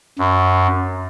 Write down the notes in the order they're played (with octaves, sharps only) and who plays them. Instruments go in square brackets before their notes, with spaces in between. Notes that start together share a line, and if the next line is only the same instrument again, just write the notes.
[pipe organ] F#2